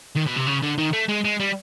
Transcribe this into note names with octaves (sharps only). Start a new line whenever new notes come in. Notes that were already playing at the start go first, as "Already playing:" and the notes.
D#3
B2
C3
C#3
D3
D#3
A3
G#3
G#3
G3